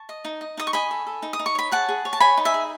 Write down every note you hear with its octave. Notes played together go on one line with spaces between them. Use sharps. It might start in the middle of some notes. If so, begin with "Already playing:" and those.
Already playing: A5 C#6
D#5
D#4
D#5
D#4 D#6
C#6
D#5 G#5 B5
A4
A4
D#4
D#6
D#4
C#6
C#5 B5
G#4 F#5 A5
G#4
C#5
A5
C#5 G#5 B5
D#4
E5 G#5
G#4